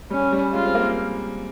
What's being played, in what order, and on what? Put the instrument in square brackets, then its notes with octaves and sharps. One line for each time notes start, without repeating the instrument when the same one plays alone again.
[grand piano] G3 [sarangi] C#4
[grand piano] G3
[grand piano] G#3 [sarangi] F4
[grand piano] C4
A#3